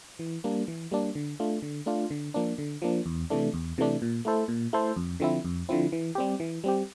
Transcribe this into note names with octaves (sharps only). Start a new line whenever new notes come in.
E3
G3 A#3 D4
E3
G3 A#3 D4
D3
A3 D4 F4
D3
A3 D4 F4
D3
F3 A#3 D4
D3
F3 A#3 D4
E2
C3 E3 A3 D4
E2
C3 E3 A3 D4
A#2
A3 E4 A4 C5
A#2
A3 E4 A4 C5
F2
D3 F3 C4 E4
F2
D3 F3 C4 E4
E3
G3 C4 G4
E3
G3 C4 G4